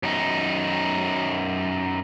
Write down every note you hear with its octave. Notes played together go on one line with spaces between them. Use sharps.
F#2 D#4